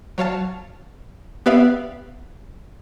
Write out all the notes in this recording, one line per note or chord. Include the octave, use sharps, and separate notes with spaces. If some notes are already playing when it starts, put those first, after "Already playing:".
F#3 C#5 F5 A5
B3 G4 B4 D5 E5 F5